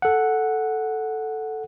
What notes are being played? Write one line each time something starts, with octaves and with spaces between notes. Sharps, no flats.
A4 F#5